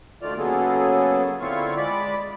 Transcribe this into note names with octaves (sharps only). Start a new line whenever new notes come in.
D2 D#3 A3 F4 D5 F6
C#3 F#3 A#3 B3 G#4 A4
D3 C4 E4 F4 F5 C#6
G#3 D5 B5 D6